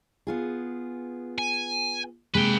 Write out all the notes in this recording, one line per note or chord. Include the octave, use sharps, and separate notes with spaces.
B3 F4 G#4
G#5
C3 G#3 A#3 B4 G5